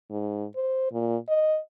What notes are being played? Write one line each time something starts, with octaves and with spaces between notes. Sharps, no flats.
G#2
C5
A#2
D#5